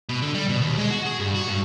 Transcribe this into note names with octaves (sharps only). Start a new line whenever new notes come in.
B2
D3
G3
B2
D#2
G#3
F#4
G#4
G2
F#4
G2